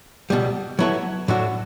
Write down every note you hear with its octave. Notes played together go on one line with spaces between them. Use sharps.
C#2 B2 G3
F#3 B3 E4 A4 C#5
A2 F#3 A3 D4 F#4